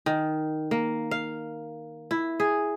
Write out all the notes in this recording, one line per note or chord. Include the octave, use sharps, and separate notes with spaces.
D#3
A#3
F5
E4
G#4